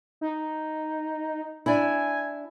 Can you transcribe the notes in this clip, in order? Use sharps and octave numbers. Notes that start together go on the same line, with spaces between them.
D#4
D4 E4 G#5